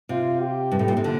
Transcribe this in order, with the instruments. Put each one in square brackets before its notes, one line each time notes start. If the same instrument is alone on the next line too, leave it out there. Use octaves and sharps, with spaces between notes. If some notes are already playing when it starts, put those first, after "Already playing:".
[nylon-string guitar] C3 [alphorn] F4
[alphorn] G4
[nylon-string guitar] G2
A2
A#2
C3
A#2 D3